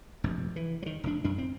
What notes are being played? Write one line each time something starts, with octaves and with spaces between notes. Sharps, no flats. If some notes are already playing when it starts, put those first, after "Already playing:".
F1 A#1 G2
E3
D#3 F#3
F1 A#2 D4
F#2 D4
C4